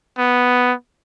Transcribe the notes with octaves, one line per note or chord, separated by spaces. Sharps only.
B3